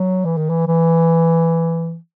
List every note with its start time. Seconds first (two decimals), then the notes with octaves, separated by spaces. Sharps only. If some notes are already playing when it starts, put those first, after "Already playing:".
Already playing: F#3
0.25 E3
0.37 D#3
0.50 E3
0.68 E3